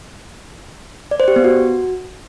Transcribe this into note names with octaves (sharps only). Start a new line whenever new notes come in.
D5
C5
G4
B3
F#4